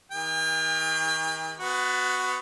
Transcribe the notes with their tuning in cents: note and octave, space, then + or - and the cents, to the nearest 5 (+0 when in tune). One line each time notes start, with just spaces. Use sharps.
D#3 +35 G#4 -45 G5 +45
B3 +25 F#4 +0